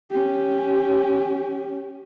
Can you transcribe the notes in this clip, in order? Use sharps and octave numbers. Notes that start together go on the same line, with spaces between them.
C#4 G4